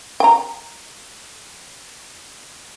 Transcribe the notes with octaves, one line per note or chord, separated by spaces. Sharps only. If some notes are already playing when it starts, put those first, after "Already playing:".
G5 A#5